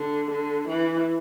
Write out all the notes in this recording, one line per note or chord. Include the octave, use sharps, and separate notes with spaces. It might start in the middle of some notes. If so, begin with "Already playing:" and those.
Already playing: D3
D3
E3